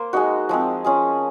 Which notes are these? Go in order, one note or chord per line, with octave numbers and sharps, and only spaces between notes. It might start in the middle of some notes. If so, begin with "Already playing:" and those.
Already playing: A#3 C5
G#3 D#4 F#4
F3 G#3 C4
C#4 F4 G#4